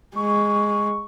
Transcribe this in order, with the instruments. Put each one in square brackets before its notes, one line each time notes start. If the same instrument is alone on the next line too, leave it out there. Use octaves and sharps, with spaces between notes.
[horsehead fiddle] G#3 [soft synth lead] C#6